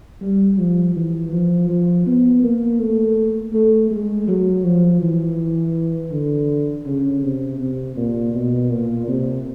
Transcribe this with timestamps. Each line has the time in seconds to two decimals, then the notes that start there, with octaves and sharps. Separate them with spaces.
0.21 G3
0.58 F3
0.95 E3
1.33 F3
1.69 F3
2.06 B3
2.43 A#3
2.80 A3
3.53 A3
3.91 G#3
4.28 F#3
4.64 F3
5.02 E3
6.12 D3
6.86 C#3
7.23 C3
7.60 C3
7.96 A#2
8.34 B2
8.70 A#2
9.07 C3